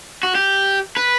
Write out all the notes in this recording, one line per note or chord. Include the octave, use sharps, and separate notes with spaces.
F#4
G4
B4